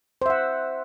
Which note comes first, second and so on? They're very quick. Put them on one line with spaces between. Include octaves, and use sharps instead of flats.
C5 E5 F#5